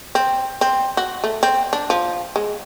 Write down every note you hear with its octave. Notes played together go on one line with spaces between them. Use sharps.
C4
C4
F#4
A3
C4
D4
F3
G#3